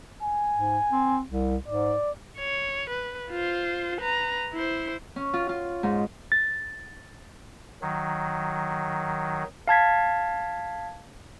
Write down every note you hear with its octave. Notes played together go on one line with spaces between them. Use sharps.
G#5
G#2
C4
C2
G#2 D5
C#5
B4
F4 C5
B4 A#5
E4 C5
C#4
F4
F4
G#2
A6
D#3 F#3
F5 A5 G#6 B6